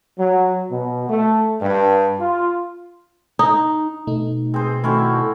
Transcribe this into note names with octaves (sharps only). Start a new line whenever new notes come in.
F#3
B2
A3
G2
F4
D#4
B2 A3 D#4
G#3 C4 G#4 C5
D#3 A3 C4 C#4 D#4 E4 F#4 A4